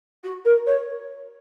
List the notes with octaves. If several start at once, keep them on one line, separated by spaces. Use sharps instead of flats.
F#4
A#4
C#5